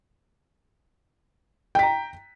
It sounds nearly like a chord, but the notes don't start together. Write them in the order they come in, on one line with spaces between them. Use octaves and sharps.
G5 B6 A#5